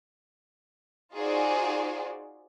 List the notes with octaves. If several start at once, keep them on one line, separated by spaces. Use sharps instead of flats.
D#4 F4 F#4 G#4 C5 D5